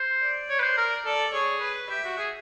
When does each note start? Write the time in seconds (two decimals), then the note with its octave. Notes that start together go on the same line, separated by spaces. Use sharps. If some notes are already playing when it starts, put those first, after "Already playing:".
Already playing: C5
0.21 D5
0.49 C#5
0.59 B4
0.63 C5
0.77 A#4
1.05 A4 D5
1.33 G#4 C#5
1.61 B4
1.89 G4 E5
2.04 F#4
2.18 G#4